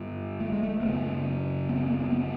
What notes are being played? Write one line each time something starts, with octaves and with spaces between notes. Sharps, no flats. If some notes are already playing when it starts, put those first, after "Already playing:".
Already playing: G2 D3
A3
G#3
A3
A#3
F#2 C#3 B3
B3
C4
A#3
A#3
C4
B3
B3